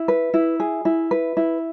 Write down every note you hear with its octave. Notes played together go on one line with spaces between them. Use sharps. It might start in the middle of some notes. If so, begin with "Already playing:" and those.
Already playing: E4
B4
E4
G#4
E4
B4
E4